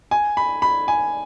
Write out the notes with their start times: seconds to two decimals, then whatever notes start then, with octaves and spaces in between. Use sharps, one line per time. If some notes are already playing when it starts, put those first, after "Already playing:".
0.11 G#5
0.37 B5
0.62 B5
0.88 G#5